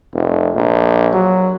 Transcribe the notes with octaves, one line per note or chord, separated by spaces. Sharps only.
F1
A#1
F#3